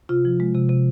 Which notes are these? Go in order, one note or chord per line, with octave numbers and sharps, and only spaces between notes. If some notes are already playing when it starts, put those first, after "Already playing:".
C3 F4
F3
G#3
C3
C3